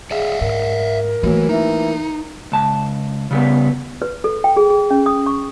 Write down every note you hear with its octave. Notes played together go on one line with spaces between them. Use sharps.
G#4 D5 E5 F5
G#2 A#4
E3 F#3 A3 A#3
E3 D#4
C#2 A5
C#3 G3 B3
B4
A4
G5
G#4
G#4
C#4
D#6
C#6